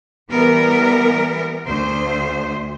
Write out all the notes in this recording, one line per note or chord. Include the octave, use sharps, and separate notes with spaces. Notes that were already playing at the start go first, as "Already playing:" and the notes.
E3 G3 B3 A#4
D2 C5